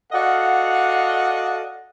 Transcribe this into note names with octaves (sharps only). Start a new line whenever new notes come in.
F#4 A4 D5 D#5 F5 F#5